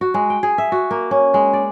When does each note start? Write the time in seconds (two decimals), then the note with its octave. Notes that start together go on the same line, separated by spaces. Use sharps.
0.01 F#4
0.14 G#3
0.30 G5
0.43 G#4
0.58 E5
0.72 F#4
0.91 A#3
1.11 C#4
1.34 G#3
1.53 D5